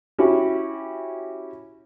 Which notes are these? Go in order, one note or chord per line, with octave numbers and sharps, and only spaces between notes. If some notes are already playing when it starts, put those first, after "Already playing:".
C#4 E4 F#4 G4